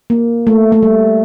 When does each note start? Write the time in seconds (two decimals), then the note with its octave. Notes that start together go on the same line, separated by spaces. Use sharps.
0.10 A#3
0.47 A3
0.72 A3
0.83 G3